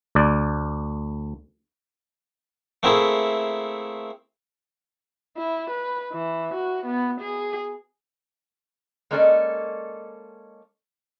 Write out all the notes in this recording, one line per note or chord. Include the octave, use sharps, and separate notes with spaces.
D2 D5
A3 A#3 C4 E4 G#4
E4
B4
E3
F#4
B3
G#4
G#3 A#3 C#4 A4 D5 D#5